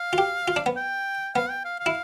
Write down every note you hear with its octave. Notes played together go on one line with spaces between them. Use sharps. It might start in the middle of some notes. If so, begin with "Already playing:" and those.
Already playing: F5
F4
G4
F4
D4
B3
G5
B3 F5
G5
F5
F5
E4